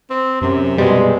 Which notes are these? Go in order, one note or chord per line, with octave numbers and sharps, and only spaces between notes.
C4
F#2 C3
B2 G3 G#3